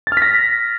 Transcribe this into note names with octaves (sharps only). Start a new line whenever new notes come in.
A6
F6
B6
A#6